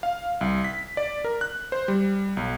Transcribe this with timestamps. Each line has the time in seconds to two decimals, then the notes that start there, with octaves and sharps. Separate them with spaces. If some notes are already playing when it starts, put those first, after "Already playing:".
0.03 F5
0.41 C2
0.64 B6
0.97 D5
1.25 A#4
1.41 F#6
1.72 C5
1.88 G3
2.37 B1